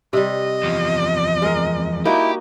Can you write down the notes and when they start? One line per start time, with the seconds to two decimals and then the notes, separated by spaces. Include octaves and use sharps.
0.13 C3 G3 D#5
0.64 E2 F3
1.42 G#3 A#4
2.05 A#3 D#4 E4 F#4 G4